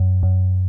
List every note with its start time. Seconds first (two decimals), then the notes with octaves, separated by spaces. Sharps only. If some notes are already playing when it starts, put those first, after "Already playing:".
Already playing: F#2
0.23 F#2